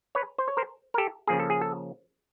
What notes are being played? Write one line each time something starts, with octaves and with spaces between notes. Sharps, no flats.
B4 C#5
C5
C#5
A#4 C5
A#4
G4 A4
C#3 F3 A#3 G#4
A4
G#4
A4